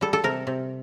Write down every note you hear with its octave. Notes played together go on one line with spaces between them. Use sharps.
G3 A4
A4
C3 A#4
C3